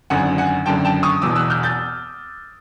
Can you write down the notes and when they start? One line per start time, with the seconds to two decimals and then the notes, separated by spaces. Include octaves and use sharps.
0.10 G#1 F#2 D3 F#5 G#5
0.38 F#5 G#5
0.66 G#1 F#2 D3 G5 A5
0.85 G5 A5
1.03 C#6 D#6
1.21 E1 E2 B2 D6 E6
1.35 E6 F#6
1.50 F6 G6
1.63 G6 A6